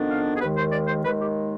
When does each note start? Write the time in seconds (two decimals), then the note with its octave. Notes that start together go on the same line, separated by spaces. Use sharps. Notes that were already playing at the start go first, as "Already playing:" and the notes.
Already playing: F2 D#3 B3 D4
0.10 F5
0.36 G#4
0.41 D#2 D#3 G#3 B4
0.57 C5
0.72 D5
0.88 C5
1.04 D#2 D#3 G#3 B4
1.19 G4